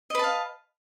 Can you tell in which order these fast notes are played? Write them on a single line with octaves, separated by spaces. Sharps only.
D#5 B4 A5 F5